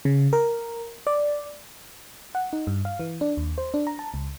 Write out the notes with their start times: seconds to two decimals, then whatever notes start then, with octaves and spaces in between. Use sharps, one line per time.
0.05 C#3
0.33 A#4
1.07 D5
2.35 F#5
2.53 D#4
2.67 G2
2.85 F5
3.00 E3
3.21 D4
3.37 D#2
3.58 C5
3.74 D4
3.87 A#5
3.99 A5
4.14 C#2